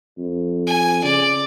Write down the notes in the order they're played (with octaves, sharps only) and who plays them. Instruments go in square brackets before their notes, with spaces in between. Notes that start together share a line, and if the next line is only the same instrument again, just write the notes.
[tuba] F2
[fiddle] G#5
[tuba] C#3 [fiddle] D5